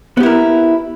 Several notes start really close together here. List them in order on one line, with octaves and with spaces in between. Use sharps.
B3 G4 E4 A#4